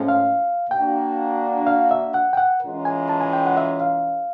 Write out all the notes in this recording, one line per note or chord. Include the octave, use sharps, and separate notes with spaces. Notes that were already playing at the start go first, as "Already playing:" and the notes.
Already playing: A2 F3 G#3 C#4
F5
A#3 D4 F#4 G5
F5
E5
F#5
G5
F#5
E3 G#3 C#4 F4 A#4
G#5
A5
G#5
G5
F#5
E5
F5